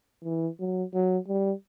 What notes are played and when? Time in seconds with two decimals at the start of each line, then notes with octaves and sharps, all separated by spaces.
0.24 E3
0.59 F#3
0.94 F#3
1.28 G3